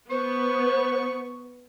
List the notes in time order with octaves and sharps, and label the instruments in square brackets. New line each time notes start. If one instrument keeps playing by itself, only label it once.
[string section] B3 [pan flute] C5 [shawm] C#6